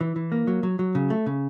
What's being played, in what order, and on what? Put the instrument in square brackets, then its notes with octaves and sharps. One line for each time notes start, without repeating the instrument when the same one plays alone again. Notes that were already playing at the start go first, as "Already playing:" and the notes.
[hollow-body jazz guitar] E3
E3
A#3
F#3
F#3
F#3
C#3
A3
C#3